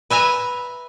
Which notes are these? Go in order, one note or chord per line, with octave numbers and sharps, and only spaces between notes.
B4 E5 G#5 A#5